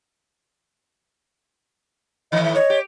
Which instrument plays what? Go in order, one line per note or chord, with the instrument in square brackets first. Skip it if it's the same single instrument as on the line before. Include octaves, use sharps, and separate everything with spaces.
[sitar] A2 D#3 E3 [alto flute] D#5
[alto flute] E5
[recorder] C#5 [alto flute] D#5
[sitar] G4